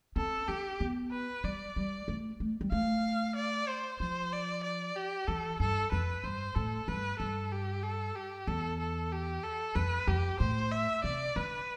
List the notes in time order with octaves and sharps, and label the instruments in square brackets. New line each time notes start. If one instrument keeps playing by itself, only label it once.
[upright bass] C4 [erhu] A4
[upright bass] D4 [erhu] G4
[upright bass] B3
[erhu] B4
[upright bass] G3 [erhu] D5
[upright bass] G3
A3
A3
G3
[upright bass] A3 [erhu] F5
[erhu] D5
C5
[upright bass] F3 [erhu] C5
[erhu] D5
D5
G4
[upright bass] E3 [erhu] A4
[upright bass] G2 [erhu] A4
[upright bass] F2 [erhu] B4
[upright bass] G2 [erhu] C5
[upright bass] A2 [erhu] A4
[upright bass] G2 [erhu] B4
[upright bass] G2 [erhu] A4
[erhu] G4
A4
G4
[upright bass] E2 [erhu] A4
[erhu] A4
G4
A4
[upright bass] F2 [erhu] B4
[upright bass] F2 [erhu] G4
[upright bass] A2 [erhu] C5
[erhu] E5
[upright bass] C3 [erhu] D5
[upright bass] D3 [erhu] B4